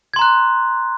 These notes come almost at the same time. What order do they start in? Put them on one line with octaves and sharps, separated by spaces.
G#6 C6 A#5 F#6